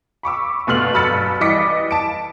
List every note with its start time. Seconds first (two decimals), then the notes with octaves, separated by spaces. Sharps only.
0.23 B5 C#6 D6 E6
0.67 G1 B2 A3 C6 F6 F#7
0.94 G1 F#3 B5 E6 A6 C#7
1.41 E3 G3 D#5 D6 B6 C#7
1.91 A5 D7